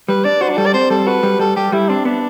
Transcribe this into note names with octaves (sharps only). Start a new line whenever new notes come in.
G3 B4
D4 D5
F#4 C5
D4
G3 A4
D5
C4 C5
G3 A4
F#4 B4
G3
G3 A4
G3 G4
G3 E4
C4 D4
B3 D4